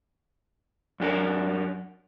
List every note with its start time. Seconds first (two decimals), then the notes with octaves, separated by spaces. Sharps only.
1.00 F#2 D4 G4 A#4